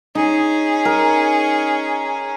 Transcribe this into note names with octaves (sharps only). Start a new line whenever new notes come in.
C#4 D#4 G#4
A#4